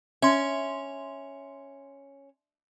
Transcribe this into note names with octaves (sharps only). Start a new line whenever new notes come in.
C#4 E5 C6